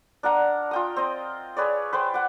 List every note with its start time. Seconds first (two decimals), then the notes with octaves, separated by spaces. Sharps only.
0.23 D4 A#4 F#5 A#5
0.71 F4 G5 D#6
0.96 C4 D#5
1.57 G#4 B4 C#5 D5
1.93 B4 C5 G5
2.14 F#5 D6